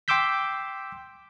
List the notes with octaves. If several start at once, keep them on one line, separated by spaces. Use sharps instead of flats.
G5 C6 D6 E6 G6 B6